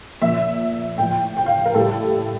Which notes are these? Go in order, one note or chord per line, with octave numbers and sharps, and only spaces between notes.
A#2 F3 E5
A2 F3 G5
G5
F5
A#4
A2 G3 A4